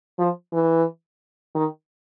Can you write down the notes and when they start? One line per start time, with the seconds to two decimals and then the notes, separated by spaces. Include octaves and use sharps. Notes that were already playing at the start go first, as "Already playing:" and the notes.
0.18 F3
0.53 E3
1.55 D#3